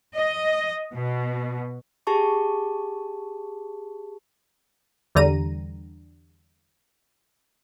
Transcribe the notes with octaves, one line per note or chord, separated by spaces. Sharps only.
D#5
B2
G4 G#4 A5 C#6
E2 D3 G3 A#5 D#7